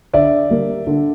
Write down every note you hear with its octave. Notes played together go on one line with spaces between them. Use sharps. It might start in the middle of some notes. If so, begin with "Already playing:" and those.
D3 D5 E5
G3 A#3
D3